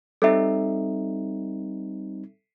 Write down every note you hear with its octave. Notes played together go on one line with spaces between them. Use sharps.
G3 C4 D#4 A4 E5